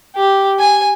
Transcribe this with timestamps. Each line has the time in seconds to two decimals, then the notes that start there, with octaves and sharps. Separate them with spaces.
0.16 G4
0.59 G#5